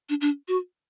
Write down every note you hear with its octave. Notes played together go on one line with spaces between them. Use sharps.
D4
D4
F#4